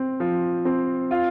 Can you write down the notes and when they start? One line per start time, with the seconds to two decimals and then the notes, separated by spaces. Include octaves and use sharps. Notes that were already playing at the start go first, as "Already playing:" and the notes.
Already playing: C4
0.20 F3
0.65 C4
1.11 F4